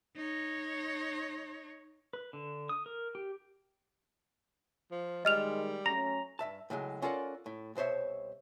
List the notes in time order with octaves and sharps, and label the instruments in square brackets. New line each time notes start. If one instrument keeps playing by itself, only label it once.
[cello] D#4 C#5
[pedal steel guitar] B4
D3
D#6
A#4
G4
[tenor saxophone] F3
[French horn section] D#3 G#3 [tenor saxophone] G3 [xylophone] D#5 F6 F7
[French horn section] F#3 A3 C#4 [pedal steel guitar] A#5 [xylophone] A#6
[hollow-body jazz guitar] G2 E5 A5
A2 C#3 F#3 G#3
C#4 F4 A4 A#4 D5 F#5
A2
C2 B2 C5 C#5 E5